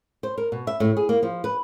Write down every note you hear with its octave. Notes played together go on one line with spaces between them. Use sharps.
C5
A#4
B2
E5
A2
G#4
A#3
F3
B4